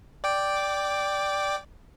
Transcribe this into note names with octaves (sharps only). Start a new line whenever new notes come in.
D5 G5 D6